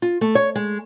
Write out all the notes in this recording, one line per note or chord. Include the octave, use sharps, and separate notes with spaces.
F4
A3
C#5
G#3